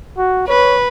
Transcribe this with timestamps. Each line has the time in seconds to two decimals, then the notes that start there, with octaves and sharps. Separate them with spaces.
0.17 F#4
0.48 B4 C#5